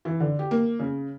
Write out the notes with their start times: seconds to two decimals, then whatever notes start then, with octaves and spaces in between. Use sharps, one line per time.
0.05 E3
0.20 D3
0.39 G4
0.51 A#3
0.79 C#3